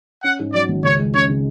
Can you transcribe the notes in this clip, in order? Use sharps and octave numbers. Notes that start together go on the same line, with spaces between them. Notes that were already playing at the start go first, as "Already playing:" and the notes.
C#4 F#5
G#2
F#3 D5
G#1
C#2 C#5
G#3
C#3 C#5
C#3